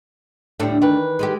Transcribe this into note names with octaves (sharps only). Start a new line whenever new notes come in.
D2 A2 G3 D4 A4
D#3 E3 B4
G#3 A3 G4